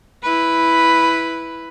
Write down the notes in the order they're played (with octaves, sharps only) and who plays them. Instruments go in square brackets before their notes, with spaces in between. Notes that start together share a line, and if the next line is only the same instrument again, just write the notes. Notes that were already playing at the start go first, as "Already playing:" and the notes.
[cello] E4 B4